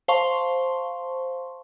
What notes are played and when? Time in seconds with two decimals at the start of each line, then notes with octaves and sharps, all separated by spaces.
0.08 C5 F5 A5 C6 C#6